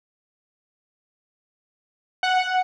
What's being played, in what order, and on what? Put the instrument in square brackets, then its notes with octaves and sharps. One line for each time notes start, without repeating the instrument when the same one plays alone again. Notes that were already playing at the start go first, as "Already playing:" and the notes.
[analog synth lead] F#5